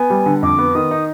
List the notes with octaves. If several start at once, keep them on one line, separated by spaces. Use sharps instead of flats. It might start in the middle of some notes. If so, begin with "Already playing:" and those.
Already playing: B3 G#5
G3
D3
F2 D6
B3
D#3 D#6
D#4